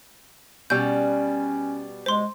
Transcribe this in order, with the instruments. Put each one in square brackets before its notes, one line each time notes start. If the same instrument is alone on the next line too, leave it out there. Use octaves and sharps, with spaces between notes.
[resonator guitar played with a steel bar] B2 G3 [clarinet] C#4 [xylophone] G6
[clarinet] G#3 [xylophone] C5 C6